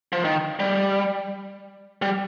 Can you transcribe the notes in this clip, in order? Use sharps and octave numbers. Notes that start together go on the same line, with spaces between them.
F3
D#3
G3
G3